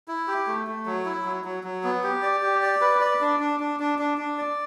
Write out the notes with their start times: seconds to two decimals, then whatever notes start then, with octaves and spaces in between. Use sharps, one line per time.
0.08 E4
0.28 G4
0.47 A3
0.67 A3
0.86 F#3
1.05 E4
1.25 F#3
1.45 F#3
1.64 F#3
1.84 B3
2.04 G4
2.22 D5
2.43 G4
2.63 D5
2.81 B4
3.01 D5
3.21 D4
3.40 D4
3.60 D4
3.80 D4
3.99 D4
4.18 D4
4.38 D5